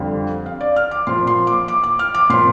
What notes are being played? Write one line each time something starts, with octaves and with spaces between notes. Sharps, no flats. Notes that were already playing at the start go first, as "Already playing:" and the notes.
Already playing: F2 D3 G3 F5
F5
D5
F6
D6
A#2 F3 C6
C6
D6
D6
D6
F6
D6
A#2 F3 C6